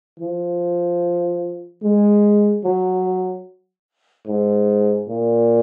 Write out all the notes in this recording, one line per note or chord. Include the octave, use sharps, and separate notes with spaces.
F3
G#3
F#3
G#2
A#2